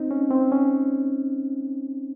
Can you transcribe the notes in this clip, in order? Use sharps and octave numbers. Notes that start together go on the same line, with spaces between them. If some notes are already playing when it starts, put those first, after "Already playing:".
Already playing: C4 D#4
C#4
C4
C#4